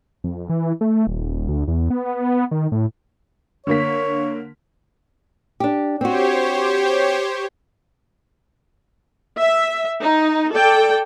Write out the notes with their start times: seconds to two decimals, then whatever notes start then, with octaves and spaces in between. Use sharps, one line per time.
0.24 F2
0.50 E3
0.81 A3
1.07 D#1
1.48 D2
1.68 E2
1.90 B3
2.51 D#3
2.72 A2
3.67 D3 A#3 C#5 B6
5.60 D4 G4
6.01 C4 F#4 G4 C5 C#5
9.38 E5
10.00 D#4
10.51 A4 D5 G5